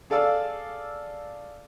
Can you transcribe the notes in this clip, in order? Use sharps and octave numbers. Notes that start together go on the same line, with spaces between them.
G#4 A4 D5 F5 E6